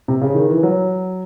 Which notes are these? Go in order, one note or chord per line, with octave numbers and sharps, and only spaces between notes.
C3
C#3
D#3
E3
F#3